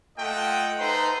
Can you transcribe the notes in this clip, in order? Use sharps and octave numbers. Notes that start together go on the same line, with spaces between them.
A3 F4 D#5 F#5 G5
D#4 A4 B4 C5 A#5 C6